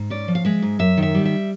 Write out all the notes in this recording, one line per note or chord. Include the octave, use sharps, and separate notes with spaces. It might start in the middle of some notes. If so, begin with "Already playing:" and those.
Already playing: G#2
C#4 D5
F3
F5
G#3 E5
G#2
F#2 E5
D#3
E5
G3
E5